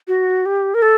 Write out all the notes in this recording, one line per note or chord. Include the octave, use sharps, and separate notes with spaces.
F#4
G4
A#4
A4